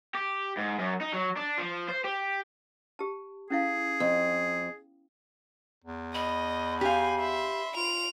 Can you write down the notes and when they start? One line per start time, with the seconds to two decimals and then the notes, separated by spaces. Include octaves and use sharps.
0.14 G4
0.57 G#2
0.79 F#2
1.01 D#4
1.13 F#3
1.36 D4
1.58 F3
1.88 C5
2.04 G4
2.99 G4 A5
3.50 C#4 E4 G#4 F5
4.00 F2
5.84 E2
6.14 D#5 B5
6.81 G4 F5 G#5
7.20 E5 C6
7.76 F4 D7 F7